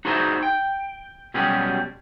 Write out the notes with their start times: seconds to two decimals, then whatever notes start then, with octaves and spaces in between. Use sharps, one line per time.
0.05 D#4 F#4 G#4 C5 D5 E5
0.43 G5
1.34 B2 F#3 G3 C#4 G4 G#4